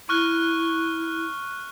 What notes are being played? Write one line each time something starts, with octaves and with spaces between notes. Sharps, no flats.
E4 C#6 F6 F#6